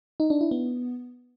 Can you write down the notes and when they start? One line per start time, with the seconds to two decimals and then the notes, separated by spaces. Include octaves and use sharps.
0.20 D#4
0.30 D4
0.41 E4
0.51 B3